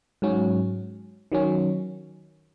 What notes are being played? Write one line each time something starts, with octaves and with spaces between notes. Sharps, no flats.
G#2 F#3 C#4
D#3 F#3 C#4